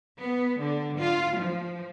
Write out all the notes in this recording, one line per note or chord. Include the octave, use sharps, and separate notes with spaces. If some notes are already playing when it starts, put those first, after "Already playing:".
B3
D3
F4
F3